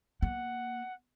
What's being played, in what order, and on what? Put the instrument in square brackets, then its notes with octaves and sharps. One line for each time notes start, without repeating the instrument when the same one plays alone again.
[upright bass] A#3 [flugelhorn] F#5